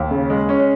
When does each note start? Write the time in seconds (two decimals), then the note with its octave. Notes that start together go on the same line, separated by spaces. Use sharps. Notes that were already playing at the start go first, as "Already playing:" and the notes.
Already playing: D#2
0.11 C#3
0.30 G#3
0.49 C#4